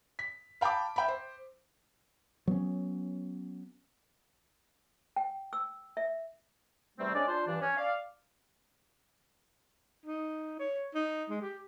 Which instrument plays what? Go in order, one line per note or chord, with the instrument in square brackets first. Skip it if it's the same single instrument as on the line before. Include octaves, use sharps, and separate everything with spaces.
[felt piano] B6
F5 G5 A5 B5 D6
E5 G5 B5
C5
[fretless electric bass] F#3 B3 C#4
[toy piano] G5
E6
E5
[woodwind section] E2 C3 G3 A3 C4
G#3 C#4 D4 D5
D4 F4 C5
G2 E3 D4
C#4
D5 F5
[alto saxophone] D#4
C#5
D#4
G#3
G4